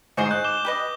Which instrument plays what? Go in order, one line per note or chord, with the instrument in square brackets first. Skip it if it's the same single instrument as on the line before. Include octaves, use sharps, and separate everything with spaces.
[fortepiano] G#2 C5 C6 [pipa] D#4 F#4 G#4
[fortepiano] F#6 [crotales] G6
[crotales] D6 E7 G7
[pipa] G4 B4 D#5